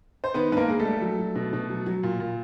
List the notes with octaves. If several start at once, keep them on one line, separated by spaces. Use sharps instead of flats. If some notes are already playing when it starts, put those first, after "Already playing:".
C5
D#3 B3 B4
G2 B4
A#3 A#4
G2 G#4
A3 A4
G3
F#3
F#3
B2
B2
F#3
F#3
A#2
A#2